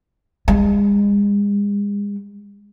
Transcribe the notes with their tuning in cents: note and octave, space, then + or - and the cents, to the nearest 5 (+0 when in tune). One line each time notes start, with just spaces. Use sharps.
G#3 -40